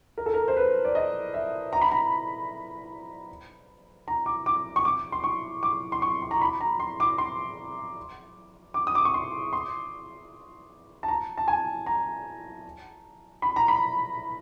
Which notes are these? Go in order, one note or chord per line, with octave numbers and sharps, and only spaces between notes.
A#4
A4
A#4
C5
B4
D5
D#5
E5
A#5
B5
A#5
A#5
D6
D6
C#6
D6
C6
C#6
D6
C6
C#6
C6
A#5
B5
A#5
C6
D6
C6
D6
D#6
D6
C#6
C6
C6
A5
A#5
A5
G#5
A#5
B5
A#5
B5